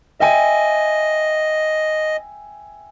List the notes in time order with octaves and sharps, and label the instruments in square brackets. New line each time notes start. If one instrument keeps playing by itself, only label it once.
[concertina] D#5 [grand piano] E5 G5 G#5